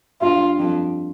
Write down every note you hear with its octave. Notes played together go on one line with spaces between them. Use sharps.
G2 F4
F2